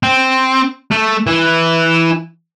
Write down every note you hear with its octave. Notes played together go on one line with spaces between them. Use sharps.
C4
A3
E3